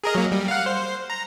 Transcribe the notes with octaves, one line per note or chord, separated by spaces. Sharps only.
G#4 A#4 D#5
F#3 A#3
G3
F5 F#5
C5
A#5